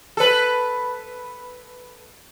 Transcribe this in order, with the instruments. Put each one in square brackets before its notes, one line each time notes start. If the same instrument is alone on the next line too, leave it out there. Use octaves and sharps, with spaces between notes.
[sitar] A4 B4